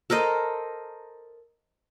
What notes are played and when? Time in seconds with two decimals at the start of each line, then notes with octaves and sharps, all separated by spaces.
0.10 A4 A#4 C5 D#5